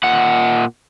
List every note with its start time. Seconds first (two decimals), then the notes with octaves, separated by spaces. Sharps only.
0.03 A#2 F#5